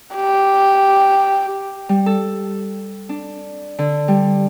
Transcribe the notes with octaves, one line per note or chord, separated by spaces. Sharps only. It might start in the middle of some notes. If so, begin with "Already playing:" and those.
G4
G3
A4
D4
D3
G3